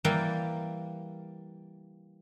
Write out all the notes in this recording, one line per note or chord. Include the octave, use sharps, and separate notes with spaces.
E3 G3 A#3 A#4 G5